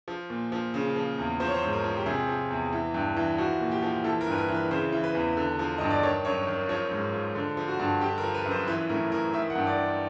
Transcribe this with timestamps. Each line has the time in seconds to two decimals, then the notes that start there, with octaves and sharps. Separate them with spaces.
0.08 F3
0.30 A#2
0.52 F3
0.74 C#3
0.96 F3
1.18 E2
1.40 F3 C5
1.47 C#5
1.54 C5
1.62 G#2
1.73 A#4
1.84 F3
1.97 G4
2.06 C3 G#4
2.28 F3
2.50 E2
2.73 E3
2.94 G2
3.17 E3
3.38 F3 F#4
3.60 A#2
3.72 G4
3.82 F3
4.04 E3 A4
4.21 A#4
4.27 G2
4.32 B4
4.38 A#4
4.49 E3
4.54 B4
4.71 C#3 C5
4.93 E3
5.04 B4
5.15 E2
5.37 D3
5.59 F3
5.78 G2 D#5
5.90 D5
6.03 D#3 C#5
6.25 F#2 C#5
6.47 D#3
6.69 F3 C#5
6.91 G#2
7.14 F3
7.35 D3
7.57 F3
7.68 F#4
7.80 G2
8.01 D3 G4
8.18 A#4
8.23 F3
8.34 B4
8.45 F#2
8.51 C5
8.68 E3 B4
8.89 A2 A#4
9.12 E3 A#4
9.34 D#3 E5
9.50 F#5
9.56 G2
9.67 D5
9.78 D#3